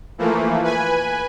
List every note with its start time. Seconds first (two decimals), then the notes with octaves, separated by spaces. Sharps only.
0.18 E3 F3 A3 A#3
0.63 B4 G#5